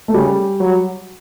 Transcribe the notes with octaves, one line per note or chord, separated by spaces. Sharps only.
A3
C#3 G3
F#3